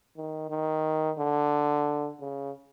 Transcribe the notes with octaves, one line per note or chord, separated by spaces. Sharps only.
D#3
D#3
D3
C#3